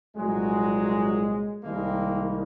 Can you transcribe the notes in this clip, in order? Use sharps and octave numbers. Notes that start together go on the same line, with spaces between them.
C2 A#2 F#3 G#3
C2 C3 D#3 G3 G#3 A#3